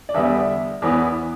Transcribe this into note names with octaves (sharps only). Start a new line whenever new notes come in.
D5
E2 D3 G3 B3 E5
E2 E3 B3